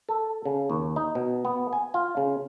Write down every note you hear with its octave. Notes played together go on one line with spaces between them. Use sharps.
A4
C#3
D#2
D#4
B2
B3
G#5
F4
C#3